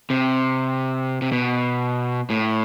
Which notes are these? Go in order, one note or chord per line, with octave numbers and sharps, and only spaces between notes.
C3
C3
B2
A2